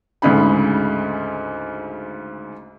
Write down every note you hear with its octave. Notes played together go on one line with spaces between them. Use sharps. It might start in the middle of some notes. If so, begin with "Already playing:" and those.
D2 G#2 C#3 B5